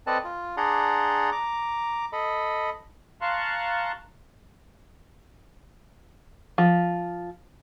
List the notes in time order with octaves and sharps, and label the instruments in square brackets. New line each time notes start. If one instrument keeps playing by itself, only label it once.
[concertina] C4 A4 B4 D5 D#5 A5
F4
D4 G#4 D5 F#5 A#5 C6
A#5 D6
A4 D#5 B5
[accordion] F5 A5 A#5 C6 C#6 F#6
[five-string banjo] F3